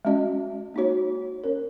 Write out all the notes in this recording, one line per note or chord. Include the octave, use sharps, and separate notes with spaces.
G#3 C#4 F#4 D#5
A#3 D#4 F#4 C#5
C#4 A#4 C#5